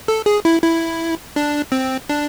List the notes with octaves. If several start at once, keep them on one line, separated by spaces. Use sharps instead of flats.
A4
G#4
E4
E4
D4
C4
D4